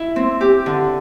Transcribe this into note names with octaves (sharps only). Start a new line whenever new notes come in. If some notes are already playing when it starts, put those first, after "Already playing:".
Already playing: E4
C4
G4
D3